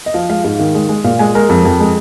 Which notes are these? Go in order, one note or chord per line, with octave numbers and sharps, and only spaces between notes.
D#5
F3 F5
G#3 F5
G#2 F5
D#3 F5
G#3
G#3
A#2 F5
G#3 G#5
G#3 A#4
F2
F2
G#3